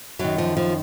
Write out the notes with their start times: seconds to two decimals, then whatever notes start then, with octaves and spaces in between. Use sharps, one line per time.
0.19 F#2 D#3 F#3
0.38 F3
0.57 F3